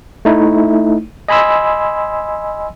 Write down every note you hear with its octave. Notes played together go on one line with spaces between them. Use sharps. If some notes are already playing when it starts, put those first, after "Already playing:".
A3 D#4 E4
D#5 G#5 B5 C6 E6